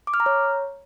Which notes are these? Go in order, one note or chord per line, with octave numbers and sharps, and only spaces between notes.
D6
F6
A#5
C#5